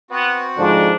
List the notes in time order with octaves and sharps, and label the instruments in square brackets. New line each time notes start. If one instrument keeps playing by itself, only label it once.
[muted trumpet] B3 [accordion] C4 F#4
[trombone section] G#2 D3 F3 [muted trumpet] D4